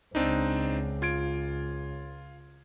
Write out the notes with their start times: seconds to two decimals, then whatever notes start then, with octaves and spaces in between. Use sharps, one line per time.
0.15 C#2 C4 D4 D#4
1.02 F4 G#6 D7